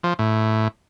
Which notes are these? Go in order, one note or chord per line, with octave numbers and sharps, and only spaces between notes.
F3
A2